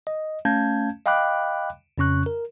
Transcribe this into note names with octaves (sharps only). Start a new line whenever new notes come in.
D#5
A3 C#4 F5 A5 G6 G#6
D#5 F5 G5 B5 D6 F#6
F2 C#3 C#4 C#6 F#6
A#4